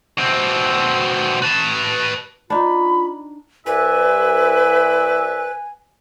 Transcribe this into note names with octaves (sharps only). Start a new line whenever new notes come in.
B2 C4
B4 A5
D4 D#4 F4 B5
C2 B4 D5 E5 G#5